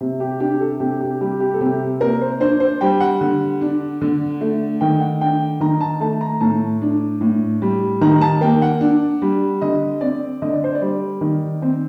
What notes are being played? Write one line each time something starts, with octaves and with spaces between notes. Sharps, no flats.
C3
G4
D4 G4
A4
C3 G4
G4
G3 G4
G4
A4
C3 G4
A#3 A#4
C5
D4 C5
C5
G3 G5
F#5
D3
D4
D3
A3
D#3 G5
F#5
D4 G5
D#3 A#5
A5
A3 A5
A#5
A2 A5
D4
A2
G3
D#3 A#5
A5
A#3 G5
F#5
D4
G3
D3 D#5
C4 D5
D3 D#5
D5
C5
D5
G3
D#3
C4